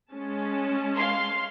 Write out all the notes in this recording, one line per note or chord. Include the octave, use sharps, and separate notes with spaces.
G#3 C#4 A5
F5 C6